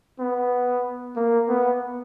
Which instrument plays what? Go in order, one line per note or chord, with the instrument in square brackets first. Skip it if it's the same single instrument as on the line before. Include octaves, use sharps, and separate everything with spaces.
[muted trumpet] B3
A#3
B3